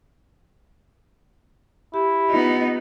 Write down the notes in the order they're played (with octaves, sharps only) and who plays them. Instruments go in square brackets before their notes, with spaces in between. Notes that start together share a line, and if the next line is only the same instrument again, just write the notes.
[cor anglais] E4 [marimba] G4
[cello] B3 D#4 [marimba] F4